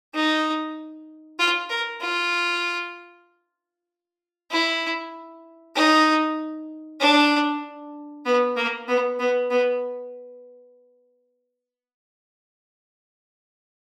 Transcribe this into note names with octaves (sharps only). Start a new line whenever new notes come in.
D#4
F4
A#4
F4
E4
D#4
D4
B3
A#3
B3
B3
B3